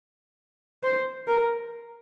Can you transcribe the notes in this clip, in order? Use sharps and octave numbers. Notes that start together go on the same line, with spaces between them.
C5
A#4